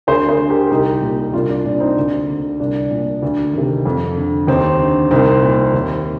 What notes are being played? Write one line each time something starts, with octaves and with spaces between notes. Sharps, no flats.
D2 G#4 C5
G#4 C5
D3
G4 A#4
C2 D#4 G4
A#2
C2 D4 F4
D4
A#2 D4
C4 D#4
D2
D3
C2 D4
A#2
D2
C3 D#3
F2
D3
D#2 C4 D#4
D3
C2 C4 D#4
A#2
D#2